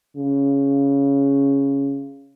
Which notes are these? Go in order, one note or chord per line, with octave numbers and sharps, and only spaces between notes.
C#3